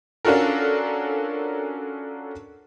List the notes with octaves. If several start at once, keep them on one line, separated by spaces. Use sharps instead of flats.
C#4 D4 F4 F#4 A4 A#4